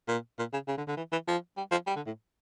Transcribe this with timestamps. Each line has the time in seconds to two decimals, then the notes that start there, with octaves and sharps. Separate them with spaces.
0.08 A#2
0.39 A#2
0.53 C#3
0.68 C#3
0.77 D3
0.88 D3
0.97 E3
1.12 E3
1.28 F3
1.57 G3
1.71 F3
1.87 G3
1.96 D3
2.06 A2